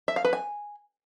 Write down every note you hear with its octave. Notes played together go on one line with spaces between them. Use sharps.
E5
F5
B4
G#5